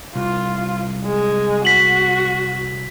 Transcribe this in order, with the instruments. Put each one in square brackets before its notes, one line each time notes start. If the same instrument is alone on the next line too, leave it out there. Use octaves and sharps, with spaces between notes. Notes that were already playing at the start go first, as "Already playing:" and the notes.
[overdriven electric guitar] C2 [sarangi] F4
[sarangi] G#3
[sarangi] F#4 [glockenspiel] B6 F#7